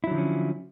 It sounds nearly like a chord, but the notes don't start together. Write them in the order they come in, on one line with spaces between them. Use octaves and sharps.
E4 F#3 D3 F3 C#4